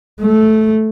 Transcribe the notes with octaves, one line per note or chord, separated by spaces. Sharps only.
A3